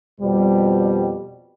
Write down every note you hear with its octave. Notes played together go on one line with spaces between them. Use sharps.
F2 B2 G3